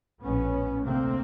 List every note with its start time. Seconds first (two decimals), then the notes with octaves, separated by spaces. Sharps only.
0.24 A#1 A2 B3 C#4
0.84 D2 C3 A#3 C4